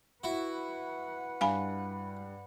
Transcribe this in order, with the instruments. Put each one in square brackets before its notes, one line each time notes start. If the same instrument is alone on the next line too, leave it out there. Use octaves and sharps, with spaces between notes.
[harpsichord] E4 F#4 [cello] B4 F#5
[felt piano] G2 [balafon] F5 G#5 B5